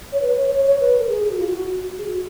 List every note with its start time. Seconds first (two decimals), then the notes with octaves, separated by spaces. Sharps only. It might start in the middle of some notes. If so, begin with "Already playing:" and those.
0.12 C#5
0.22 B4
0.35 C#5
0.50 C#5
0.66 C#5
0.80 B4
0.99 A#4
1.09 G#4
1.24 G#4
1.31 F#4
1.39 F4
1.47 F#4
1.98 G#4
2.06 F#4